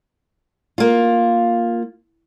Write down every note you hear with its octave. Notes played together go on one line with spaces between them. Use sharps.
A#3 F4